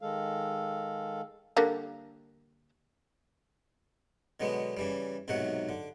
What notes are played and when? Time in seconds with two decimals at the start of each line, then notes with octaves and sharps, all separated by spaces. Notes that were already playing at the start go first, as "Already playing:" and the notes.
0.01 D#3 G#3 A4 F5
1.57 D3 G3 A#3
4.40 B2 D3 F#3 G#3 B3
4.77 C#3 E3 G3
5.28 B1 G#2 C3 D#3 F#3 F#5
5.69 D3